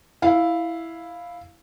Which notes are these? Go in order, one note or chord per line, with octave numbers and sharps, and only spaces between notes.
E4 F5